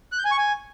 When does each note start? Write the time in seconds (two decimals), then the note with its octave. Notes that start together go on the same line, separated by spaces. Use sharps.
0.12 F#6
0.18 G6
0.25 G#5
0.31 C#6
0.38 G#5